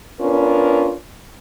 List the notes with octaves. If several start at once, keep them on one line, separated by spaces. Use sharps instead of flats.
B3 C#4 D4 F4 A#4